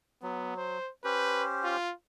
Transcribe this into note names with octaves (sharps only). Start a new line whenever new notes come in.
F#3 B3
C5
C#4 G4 B4 C5
F4